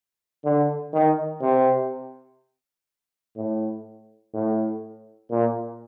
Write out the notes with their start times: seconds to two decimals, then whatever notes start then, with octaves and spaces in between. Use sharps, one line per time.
0.45 D3
0.93 D#3
1.41 C3
3.36 A2
4.34 A2
5.31 A#2